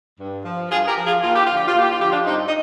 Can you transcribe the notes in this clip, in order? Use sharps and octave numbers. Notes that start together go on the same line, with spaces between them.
G2
F3
G2 F4 G#4
G4 A#4
F3
F4 G#4
D#2 F4
G4
D3 F3 F4
G4
F4
D#2 G4
F4
D3 F3 G4
D4 F4
G2 C4 D#4
D#4